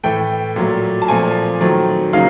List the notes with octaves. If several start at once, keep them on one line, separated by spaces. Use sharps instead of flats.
A2 E3 A3 G5
A#2 F#3 A3
A5
A#2 F3 A3 C4 G#5
D#3 F#3 A3 C4
C#3 F#3 A#3 D#4 F5